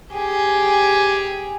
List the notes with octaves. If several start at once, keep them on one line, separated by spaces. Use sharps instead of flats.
G4 G#4